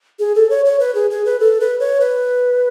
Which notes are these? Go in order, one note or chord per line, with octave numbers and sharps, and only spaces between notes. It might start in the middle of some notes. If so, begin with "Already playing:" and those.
G#4
A4
C#5
C#5
B4
G#4
G#4
B4
A4
B4
C#5
B4